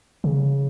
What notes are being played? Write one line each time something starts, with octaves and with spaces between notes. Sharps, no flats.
C#3